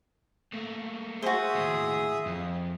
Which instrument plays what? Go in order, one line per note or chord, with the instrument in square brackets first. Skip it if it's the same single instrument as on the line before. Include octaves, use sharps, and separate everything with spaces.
[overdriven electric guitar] A3 A#3
[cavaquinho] F#4 C5 [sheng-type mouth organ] G#4 E5 D#6
[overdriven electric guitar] D#2 A2
F2